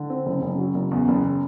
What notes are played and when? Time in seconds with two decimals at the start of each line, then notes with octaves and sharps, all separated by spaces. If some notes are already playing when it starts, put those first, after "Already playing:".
Already playing: D3
0.10 C4
0.26 F#1
0.42 F#1
0.58 F#3
0.74 F#1
0.91 E2
1.08 F#1